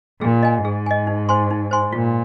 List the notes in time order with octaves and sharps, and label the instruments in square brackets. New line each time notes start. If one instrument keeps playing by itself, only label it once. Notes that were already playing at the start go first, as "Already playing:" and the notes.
[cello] A#2 [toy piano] G#4
[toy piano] D#5 G#5
[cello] G#2 [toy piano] G#4
[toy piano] D#5 G#5
D#4
C5 G#5 C6
D#4
C5 G#5 C6
[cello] A#2 [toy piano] F4